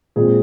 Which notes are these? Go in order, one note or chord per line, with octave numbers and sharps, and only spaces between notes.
A#2 G#3 C4 G#4